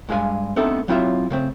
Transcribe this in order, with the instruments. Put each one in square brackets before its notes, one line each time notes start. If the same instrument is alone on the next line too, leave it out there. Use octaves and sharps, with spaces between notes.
[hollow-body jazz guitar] G2 G#3 G#4 F5 G#5
A3 B3 C4 D4 D#4 A4
F#3 C4 E4 F4 C#5 E5
C#3 A3 C4